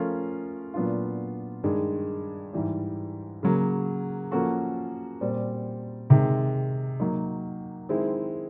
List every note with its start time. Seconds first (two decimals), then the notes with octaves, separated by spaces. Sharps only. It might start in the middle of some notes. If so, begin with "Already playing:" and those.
Already playing: F3 A3 C#4 F4 A#4
0.74 A#2 F#3 B3 D4 F4
1.63 G2 D#3 G#3
2.53 G#2 E3 G3
3.43 C#3 F#3 A#3
4.31 F3 A#3 C#4 F#4 A4
5.21 A#2 G3 C4
6.10 C3 D#3 G#3
7.00 F#3 A#3 D#4
7.89 D#3 G#3 C4 E4 G#4